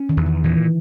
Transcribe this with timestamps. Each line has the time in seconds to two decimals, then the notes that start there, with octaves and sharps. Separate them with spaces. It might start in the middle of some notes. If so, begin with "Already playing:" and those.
Already playing: C#4
0.09 D#3
0.17 E2
0.26 D#3
0.44 A#2 E3